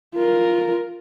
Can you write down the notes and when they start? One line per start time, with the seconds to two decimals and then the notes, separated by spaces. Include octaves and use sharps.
0.15 F4 A#4